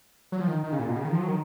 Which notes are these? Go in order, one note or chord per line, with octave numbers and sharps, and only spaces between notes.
F#3
F3
D#3
D#3
C#3
A#2
B2
C#3
D#3
F3
F#3
D#3